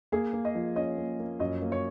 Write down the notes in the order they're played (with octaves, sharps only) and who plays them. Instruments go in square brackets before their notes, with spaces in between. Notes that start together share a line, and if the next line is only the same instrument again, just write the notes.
[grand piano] A#3 [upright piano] G#4
[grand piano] A#3
[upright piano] D#5
[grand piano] F3
[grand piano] C#4 [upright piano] D#5
[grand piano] A#3
A#3
[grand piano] F#2 [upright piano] D#5
[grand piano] A#3
[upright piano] C#5